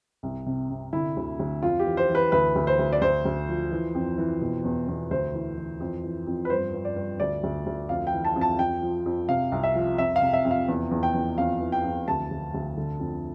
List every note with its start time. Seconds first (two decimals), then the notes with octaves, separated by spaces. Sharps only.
0.23 C2
0.46 C3
0.70 C3
0.93 D3 E4
1.17 D2
1.39 D2
1.62 F2 F4
1.79 G4
1.86 E3
1.97 C5
2.09 E3
2.15 B4
2.32 D2 B4
2.55 D2
2.67 C5
2.79 D2
2.93 D5
3.02 D2 C5
3.25 D2
3.48 F3
3.71 E3
3.95 F2
4.18 E3
4.41 B2
4.64 E2
4.88 E2
5.11 D2 C5
5.34 E3
5.58 E3
5.80 F2
6.04 E3
6.27 F2
6.45 B4
6.50 G2 C5
6.73 G2
6.85 D5
6.96 G2
7.20 D2 D5
7.43 D2
7.66 D2
7.89 F2 F5
8.07 G5
8.13 E3
8.25 A5
8.36 F2
8.41 A5
8.59 F2 G5
8.82 F3
9.06 F2
9.29 C3 F5
9.52 C2
9.63 E5
9.75 F3
9.98 F2 E5
10.16 F5
10.22 C3
10.33 E5
10.45 F2
10.51 F5
10.68 E2
10.91 E2
11.03 G5
11.14 E2
11.38 F2 F5
11.61 E3
11.72 G5
11.84 F2
12.07 D2 A5
12.31 D2
12.54 D2
12.77 D3
13.00 F2